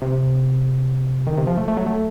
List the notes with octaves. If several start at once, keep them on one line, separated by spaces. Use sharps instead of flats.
C3
D#3
C3
F3
A3
A3
F#3
A3